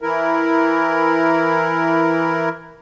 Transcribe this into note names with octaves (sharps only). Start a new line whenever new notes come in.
E3 E4 A#4